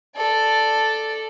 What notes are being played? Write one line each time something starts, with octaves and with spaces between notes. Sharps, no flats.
A4 D5